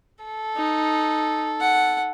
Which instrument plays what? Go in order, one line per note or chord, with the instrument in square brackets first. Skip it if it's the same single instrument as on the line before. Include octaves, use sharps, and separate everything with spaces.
[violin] A4
[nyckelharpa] D#4
F#5